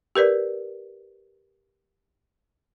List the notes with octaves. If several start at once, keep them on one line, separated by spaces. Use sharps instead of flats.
G4 A#4 B4 D5